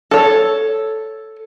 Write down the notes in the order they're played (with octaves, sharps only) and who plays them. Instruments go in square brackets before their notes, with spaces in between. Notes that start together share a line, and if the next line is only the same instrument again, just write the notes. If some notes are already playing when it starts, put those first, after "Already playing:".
[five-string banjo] A4 C#5